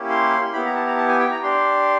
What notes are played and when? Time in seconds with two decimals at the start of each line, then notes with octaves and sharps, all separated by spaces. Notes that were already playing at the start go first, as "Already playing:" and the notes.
Already playing: A#3 C#4 E4 G4
0.09 C6
0.53 B3 E4 G4 B5
0.65 A#5
0.76 A5
0.87 A#5
0.97 A5
1.08 G#5
1.19 G5
1.31 A#5
1.43 D4 G4 C6